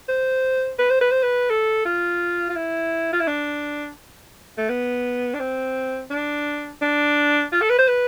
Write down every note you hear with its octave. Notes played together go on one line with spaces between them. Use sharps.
C5
B4
C5
B4
C5
B4
A4
F4
F4
E4
F4
E4
D4
A3
B3
D4
C4
D4
D4
F4
A4
B4
C5
B4